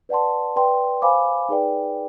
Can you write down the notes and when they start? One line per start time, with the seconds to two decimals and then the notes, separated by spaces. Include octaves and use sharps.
0.09 B4 D5 F#5 A5 C6
0.56 B4 D5 G5 C6
1.02 C5 F5 G#5 B5 D6
1.49 D#4 G#4 B4 D5 G5